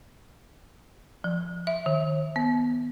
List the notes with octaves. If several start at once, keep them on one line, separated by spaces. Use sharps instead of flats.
F3
E5
D#3
B3